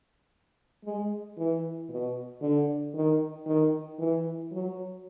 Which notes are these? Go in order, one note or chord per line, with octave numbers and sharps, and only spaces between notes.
G#3
E3
B2
D3
D#3
D#3
E3
F#3